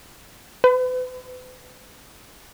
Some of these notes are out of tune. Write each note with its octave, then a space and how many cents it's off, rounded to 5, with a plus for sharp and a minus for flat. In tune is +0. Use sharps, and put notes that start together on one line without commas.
B4 +40